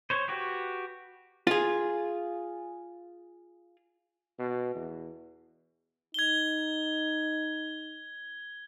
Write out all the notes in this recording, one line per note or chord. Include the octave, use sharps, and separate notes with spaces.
C5 C#5
F#4 G4 B4
F4 G#4
B2
E2
D#4 G#6 G7